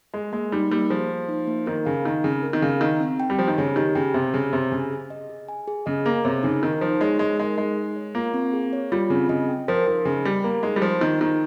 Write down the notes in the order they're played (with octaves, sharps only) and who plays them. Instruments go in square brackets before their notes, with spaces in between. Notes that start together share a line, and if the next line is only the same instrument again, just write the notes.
[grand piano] G#3 [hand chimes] G#4
[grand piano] G#3 [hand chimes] A#3
[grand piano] G3 [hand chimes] D#4
[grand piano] G3 [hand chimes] A#3
[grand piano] F3 [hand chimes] G#4
[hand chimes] A#3
D#4
A#3
[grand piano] D#3 [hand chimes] A#4
[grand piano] C#3 [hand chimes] F5
[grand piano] D#3 [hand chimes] D#4
[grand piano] C#3 [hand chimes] C4
[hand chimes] A#4
[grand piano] D#3
[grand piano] C#3 [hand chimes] F5
[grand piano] D#3 [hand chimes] D#4
[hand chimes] C4
G5
[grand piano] G3
[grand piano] F3 [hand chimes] G4
[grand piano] D#3
[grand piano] C#3 [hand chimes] C#5
[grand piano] D#3 [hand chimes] G4
[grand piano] C#3 [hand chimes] G5
[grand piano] C3 [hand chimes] G4
[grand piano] C#3 [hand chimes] C#5
[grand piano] C3 [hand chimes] G4
[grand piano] C#3 [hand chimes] G#5
[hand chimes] G#4
D#5
G#4
G#5
G#4
[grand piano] C#3 [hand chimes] D#5
[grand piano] A#3 [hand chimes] G#4
[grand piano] C3 [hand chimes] C#5
[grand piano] C#3 [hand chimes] D#4
[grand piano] D#3 [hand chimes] A#4
[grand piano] F3 [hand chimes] D#4
[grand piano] G#3 [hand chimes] C#5
[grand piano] G#3 [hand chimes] D#4
[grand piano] G#3 [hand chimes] A#4
[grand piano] G#3 [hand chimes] D#4
[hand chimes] G#4
C#5
[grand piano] A#3 [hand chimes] F4
[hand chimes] C4
G#4
C#5
[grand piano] G3 [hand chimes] F4
[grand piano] C#3 [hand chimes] C4
[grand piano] C#3 [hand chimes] D#5
[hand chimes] G5
[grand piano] F3 [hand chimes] A#4
[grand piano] F3 [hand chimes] D#4
[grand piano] C#3 [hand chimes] D#5
[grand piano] G3 [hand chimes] G5
[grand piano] A#3 [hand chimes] A#4
[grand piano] G#3 [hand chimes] D#4
[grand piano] G3
[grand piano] F3 [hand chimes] C5
[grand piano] D#3 [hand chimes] F4
[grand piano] D#3 [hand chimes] G#4